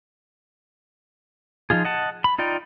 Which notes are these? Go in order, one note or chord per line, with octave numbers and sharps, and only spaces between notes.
F3 D#4 F4 G#4
D#5 F#5 A5
B5
D#4 F4 D5 G5